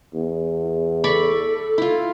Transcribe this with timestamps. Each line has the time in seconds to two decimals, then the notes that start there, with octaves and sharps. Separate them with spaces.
0.14 E2
1.04 A4 D5 B5 C#6
1.78 E4 F4